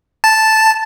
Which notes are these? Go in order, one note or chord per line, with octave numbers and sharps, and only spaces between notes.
A5